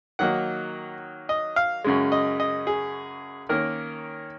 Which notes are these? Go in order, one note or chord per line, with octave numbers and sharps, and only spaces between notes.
D#3 F#3 A#3 D#4 F#5
D#5
F5
F#2 C#3 G#3
D#5
D#5
G#4
D#3 A#3 C#4 A#4